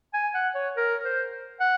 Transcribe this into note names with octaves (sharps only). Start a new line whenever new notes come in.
G#5
F#5
C#5
A#4
C5
F#5